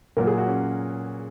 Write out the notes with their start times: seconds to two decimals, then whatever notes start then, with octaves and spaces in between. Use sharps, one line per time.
0.17 A#2 F#3 A#3 A#4
0.27 G#4
0.38 F#4
0.47 C#4